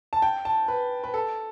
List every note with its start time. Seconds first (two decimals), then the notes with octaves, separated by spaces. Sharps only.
0.13 A5
0.22 G5
0.45 A5
0.68 B4
1.04 B4
1.14 A4